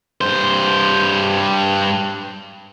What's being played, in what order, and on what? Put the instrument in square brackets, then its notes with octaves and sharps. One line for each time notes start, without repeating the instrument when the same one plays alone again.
[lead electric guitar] G2 C5